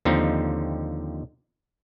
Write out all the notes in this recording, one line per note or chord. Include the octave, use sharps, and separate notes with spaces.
D#2 D3 F3 C4 D#4